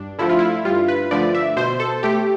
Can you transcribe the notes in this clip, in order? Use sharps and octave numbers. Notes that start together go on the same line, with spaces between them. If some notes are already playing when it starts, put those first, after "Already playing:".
Already playing: G2 D4
D3 F3 A3 E4
F4
E4
G2 F4
B4
D3 F3 A3 D5
E5
B2 C5
A4
A3 G4